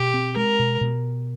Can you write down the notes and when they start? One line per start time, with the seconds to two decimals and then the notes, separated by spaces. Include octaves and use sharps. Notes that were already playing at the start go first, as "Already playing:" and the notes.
Already playing: B2 G4
0.14 C4
0.36 G#3 A#4
0.59 B2
0.81 B2